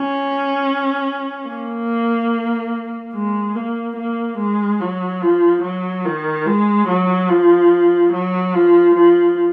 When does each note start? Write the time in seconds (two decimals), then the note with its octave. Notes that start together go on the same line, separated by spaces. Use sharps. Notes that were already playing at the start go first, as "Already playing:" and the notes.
Already playing: C#4
1.48 A#3
3.14 G#3
3.55 A#3
3.97 A#3
4.38 G#3
4.80 F#3
5.22 F3
5.63 F#3
6.05 D#3
6.46 G#3
6.88 F#3
7.29 F3
8.12 F#3
8.54 F3
8.95 F3